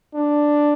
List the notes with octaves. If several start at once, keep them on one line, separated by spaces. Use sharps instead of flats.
D4